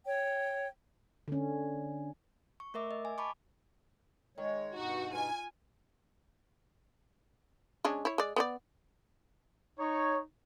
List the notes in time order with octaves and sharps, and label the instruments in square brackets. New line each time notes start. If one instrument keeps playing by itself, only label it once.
[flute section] C#5 G5
[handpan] D3 C#4
[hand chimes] C#6
A3 A#4 E5 D6
D#5
G#5
A5 B5 C#6 D6
[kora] D#3 [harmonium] G#3 C#5
[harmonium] G2 B2 D#4 [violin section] F#4
[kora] F4 [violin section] G#5
[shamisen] G#3 C#4 D4
E4 C#5
G#3 D5
B3 B4 D5
[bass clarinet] D#4 [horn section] C#5